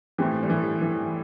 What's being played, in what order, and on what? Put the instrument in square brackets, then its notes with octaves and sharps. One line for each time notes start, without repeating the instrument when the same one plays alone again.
[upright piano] A2 A3 C4 G4 [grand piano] E3
[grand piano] G3
E3
E3